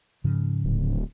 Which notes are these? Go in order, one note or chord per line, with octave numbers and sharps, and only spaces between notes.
G#2 C#3 F3
D1